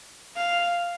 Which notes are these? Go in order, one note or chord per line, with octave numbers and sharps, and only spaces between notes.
F5